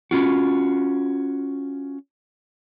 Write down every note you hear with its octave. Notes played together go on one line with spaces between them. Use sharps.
C#4 F4 F#4